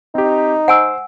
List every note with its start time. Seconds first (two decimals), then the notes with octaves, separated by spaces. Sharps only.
0.15 C4 D#4 G4
0.68 C5 F#5 G#5 E6